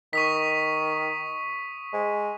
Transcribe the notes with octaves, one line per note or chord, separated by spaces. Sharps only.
D#3 C#6 D#6 B6
G#3